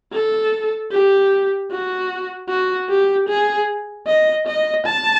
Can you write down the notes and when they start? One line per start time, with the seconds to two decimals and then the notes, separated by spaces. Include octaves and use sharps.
0.13 A4
0.92 G4
1.71 F#4
2.49 F#4
2.89 G4
3.29 G#4
4.07 D#5
4.47 D#5
4.86 A5